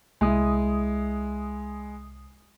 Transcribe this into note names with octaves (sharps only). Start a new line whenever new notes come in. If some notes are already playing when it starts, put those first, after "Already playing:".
C2 G#3 E4 D#6